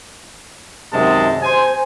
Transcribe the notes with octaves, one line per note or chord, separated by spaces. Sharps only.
F#2 C3 D#3 G#3 D#5 A5
C5 G#5